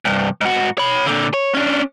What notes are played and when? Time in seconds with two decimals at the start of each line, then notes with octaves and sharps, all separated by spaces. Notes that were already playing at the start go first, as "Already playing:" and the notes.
0.05 C2 G2
0.41 G#2 F#4
0.78 C#5 B5
1.06 A#2 D3
1.34 C#5
1.55 C#4 D4